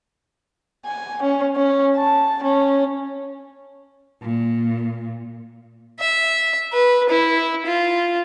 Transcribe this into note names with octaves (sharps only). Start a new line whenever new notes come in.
G#5
C#4
C#4
A5
C#4
A#2
E5
B4
E4
F4